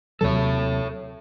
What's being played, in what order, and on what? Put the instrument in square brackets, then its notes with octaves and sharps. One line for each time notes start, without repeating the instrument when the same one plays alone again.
[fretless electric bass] D#2 C3 F#3 [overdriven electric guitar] A4 C#5